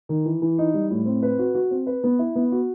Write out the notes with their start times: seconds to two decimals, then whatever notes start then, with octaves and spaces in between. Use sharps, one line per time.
0.09 D#3
0.26 E3
0.42 E3
0.58 D#4
0.74 G3
0.90 A2
1.06 C4
1.23 B4
1.39 F#4
1.55 F#4
1.71 C4
1.87 B4
2.04 B3
2.19 E4
2.36 B3
2.52 F#4